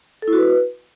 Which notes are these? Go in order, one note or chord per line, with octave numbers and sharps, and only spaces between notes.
A4
E4
F#4
B4